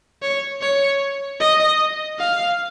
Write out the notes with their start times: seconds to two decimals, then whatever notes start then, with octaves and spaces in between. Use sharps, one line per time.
0.22 C#5
0.62 C#5
1.40 D#5
2.19 F5